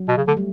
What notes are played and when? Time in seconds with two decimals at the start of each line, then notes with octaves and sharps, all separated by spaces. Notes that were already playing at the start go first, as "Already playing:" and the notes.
Already playing: F#3
0.08 B2
0.17 C#3
0.28 D3 A3
0.37 G3